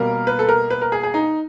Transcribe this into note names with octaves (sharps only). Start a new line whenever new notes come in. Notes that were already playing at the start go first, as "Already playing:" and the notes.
Already playing: B2 G3 A#3 A#4
B4
A4
A#4
B4
A#4
G#4
G#4
D#4